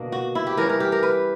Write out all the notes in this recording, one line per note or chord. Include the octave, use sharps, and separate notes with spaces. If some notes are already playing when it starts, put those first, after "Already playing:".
Already playing: B2 D3 A#3 D4
F#4
E4
G4
E3 G3 C#4 A#4
A#4
G4
A#4
B4